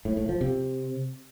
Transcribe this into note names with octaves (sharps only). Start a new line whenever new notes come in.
A2
A2
F3
C3